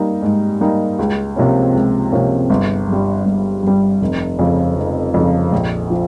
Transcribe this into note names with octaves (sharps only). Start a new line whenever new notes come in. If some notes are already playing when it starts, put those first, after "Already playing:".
Already playing: G3 A#3 D#4
G#2
G3 A#3 D#4
C#2
C3 F3 A#3 C#4
C#2
C3 F3 A#3 C#4
G1
G2
G3
G1
G2 G3
F1
F2 C#3 F3
F1
F2 C#3 F3
A#1
F3